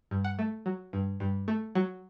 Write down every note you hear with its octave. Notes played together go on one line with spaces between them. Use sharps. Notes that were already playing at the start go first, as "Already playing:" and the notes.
G2
F#5
A3
F#3
G2
G2
A3
F#3